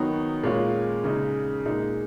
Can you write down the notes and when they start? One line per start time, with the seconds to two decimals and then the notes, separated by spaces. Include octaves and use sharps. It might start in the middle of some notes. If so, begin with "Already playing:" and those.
Already playing: D#3 F#3 B3 D#4
0.43 A#2 G#3 C#4 F4
1.04 C#3 G#3 D#4
1.65 A#2 G#3 D#4